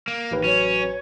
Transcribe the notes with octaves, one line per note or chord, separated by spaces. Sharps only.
A#3
A1 D#2 B4
F#3 C#4 C#5